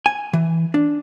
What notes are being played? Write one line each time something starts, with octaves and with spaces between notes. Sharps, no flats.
G#5
E3
D4